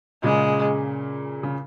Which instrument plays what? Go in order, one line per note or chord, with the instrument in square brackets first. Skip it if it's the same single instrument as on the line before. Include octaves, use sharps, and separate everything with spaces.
[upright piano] A#2 C#3 [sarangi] G#3
[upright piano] C#3